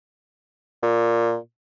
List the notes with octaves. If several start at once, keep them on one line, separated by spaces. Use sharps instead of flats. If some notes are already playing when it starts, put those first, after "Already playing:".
A#2